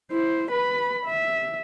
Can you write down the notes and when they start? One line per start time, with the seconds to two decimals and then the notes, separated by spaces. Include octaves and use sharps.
0.12 E4 C5
0.51 B4 B5
1.06 E5